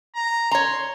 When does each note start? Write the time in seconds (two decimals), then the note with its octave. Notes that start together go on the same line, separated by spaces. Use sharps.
0.15 A#5
0.51 C#5 A#5 C6